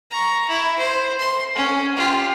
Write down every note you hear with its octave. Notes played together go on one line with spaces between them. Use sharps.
A#5 C#6
E4
C5
C6
C#4
F4 G4